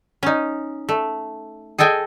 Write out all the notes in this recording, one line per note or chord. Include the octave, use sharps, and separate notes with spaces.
C#4 D#4
A3
G#4 A4 D#5 G5 G#5